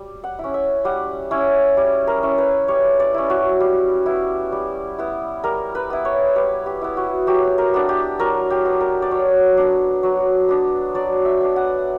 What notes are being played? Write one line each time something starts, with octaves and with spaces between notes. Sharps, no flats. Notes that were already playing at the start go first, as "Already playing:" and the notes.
Already playing: G3
F#5
C#4 E4
E5
G3 F#5
C#4 E4
G3
A#4
C#4 E4
B4
G3 C#5
D5
C#4 E4
F#4
G3
B3 E4
G3
B3 E4
G3 A#4
B4
B3 E4
C#5
G3 B4
G4
B3 E4
F#4
F#3 G4
A#4
B3 D4
G4
F#3 A#4
G4
B3 D4
A#4
D5
F#3 C#5
B3 D4
F#3
B3 D4
F#3 D5
E5
B3 D4
F#5